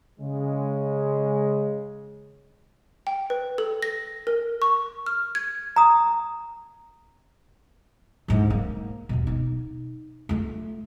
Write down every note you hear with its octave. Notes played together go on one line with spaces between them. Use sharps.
C#3 G#3
G5
B4
A4
A#6
A#4
C#6
F6
G#6
A#5 D#6
G#2 D3
A#3
D#2 B2
D#4
A3 F4